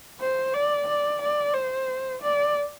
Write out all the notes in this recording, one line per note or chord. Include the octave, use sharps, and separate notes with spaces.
C5
D5
D5
D5
C5
D5